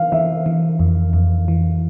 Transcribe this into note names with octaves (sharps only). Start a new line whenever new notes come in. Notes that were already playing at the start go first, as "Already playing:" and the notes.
Already playing: E3 F5
E3 E5
E3
F2
F2
E3